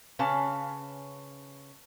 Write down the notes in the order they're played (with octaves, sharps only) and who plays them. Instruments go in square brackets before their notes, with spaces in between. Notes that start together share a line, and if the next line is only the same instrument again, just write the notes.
[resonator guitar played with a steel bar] C#3 C#4 B4 F5 A5